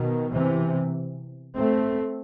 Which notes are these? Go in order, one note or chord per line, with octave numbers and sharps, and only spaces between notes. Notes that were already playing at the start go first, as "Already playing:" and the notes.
Already playing: B2 D#3
C3 E3
A3 C4